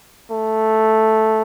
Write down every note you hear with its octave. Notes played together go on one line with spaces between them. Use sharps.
A3